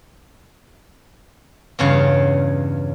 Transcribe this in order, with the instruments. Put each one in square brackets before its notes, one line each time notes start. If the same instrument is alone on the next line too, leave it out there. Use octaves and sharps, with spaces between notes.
[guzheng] E2 G2 C#3 C#5 F5